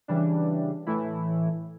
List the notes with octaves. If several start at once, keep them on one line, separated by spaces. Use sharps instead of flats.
C#3 E3 G3 D4
A2 E3 A3 E4